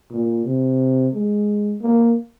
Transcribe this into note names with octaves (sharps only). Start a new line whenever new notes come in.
A#2
C3
G#3
A#3